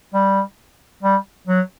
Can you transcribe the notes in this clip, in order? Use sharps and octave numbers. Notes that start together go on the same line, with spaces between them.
G3
G3
F#3